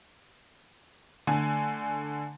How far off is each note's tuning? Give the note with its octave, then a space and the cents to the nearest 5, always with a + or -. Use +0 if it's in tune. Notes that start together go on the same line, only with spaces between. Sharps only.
D3 +0 A3 +0 G#5 +10